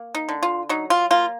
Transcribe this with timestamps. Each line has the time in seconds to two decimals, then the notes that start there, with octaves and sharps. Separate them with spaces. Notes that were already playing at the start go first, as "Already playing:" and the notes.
Already playing: A#3
0.15 D#4
0.29 D3
0.43 F4
0.69 F#3 D#4
0.90 F4
1.11 A#3 F4